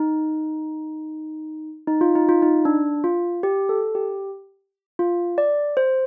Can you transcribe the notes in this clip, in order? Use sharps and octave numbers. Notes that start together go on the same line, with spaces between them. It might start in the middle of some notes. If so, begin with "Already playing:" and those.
Already playing: D#4
D#4
F4
D#4
F4
D#4
D4
F4
G4
A4
G4
F4
D5
C5